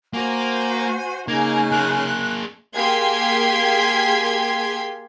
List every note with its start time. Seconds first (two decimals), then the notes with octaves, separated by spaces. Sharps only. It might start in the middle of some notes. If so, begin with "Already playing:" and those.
0.14 A#3 F#4 C5 G#5
1.28 C#3 A#3 D#4 G#5 G#6
1.72 A#3 G#4 F#6
2.76 A#3 G4 G#4 C6 G#6 B6